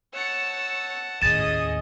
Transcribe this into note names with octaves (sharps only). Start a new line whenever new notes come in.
C#5 F#5 A5 E6
D#2 A2 C#4 G#4 D#5 D#6 A6 E7